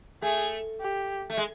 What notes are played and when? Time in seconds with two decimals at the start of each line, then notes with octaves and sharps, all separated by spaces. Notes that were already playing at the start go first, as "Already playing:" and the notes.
0.22 A3 G#4
0.80 G4
1.30 A3
1.37 G#3